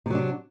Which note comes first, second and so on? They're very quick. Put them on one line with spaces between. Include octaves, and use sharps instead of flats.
C3 F#3 D4